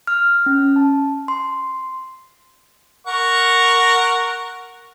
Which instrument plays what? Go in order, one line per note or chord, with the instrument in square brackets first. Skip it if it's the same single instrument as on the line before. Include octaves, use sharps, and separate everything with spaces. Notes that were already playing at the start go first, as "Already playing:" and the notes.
[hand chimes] F6
C#4
A5
C6
[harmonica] A#4 F#5 C#6